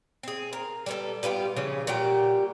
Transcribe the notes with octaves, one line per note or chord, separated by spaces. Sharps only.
C4 G#4
A#4
G3 B3 A4
G3 B3 F4 G4
C#3 E3 F3 C#4
A#2 G3 F#4 G4